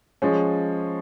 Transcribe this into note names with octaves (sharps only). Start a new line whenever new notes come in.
F3 G#3 C#4